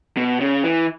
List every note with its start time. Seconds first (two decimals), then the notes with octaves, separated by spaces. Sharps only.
0.17 B2
0.40 C#3
0.64 E3